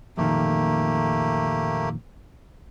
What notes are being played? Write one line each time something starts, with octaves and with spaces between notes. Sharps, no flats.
F2 A#2 D#3 A3 A#3 G4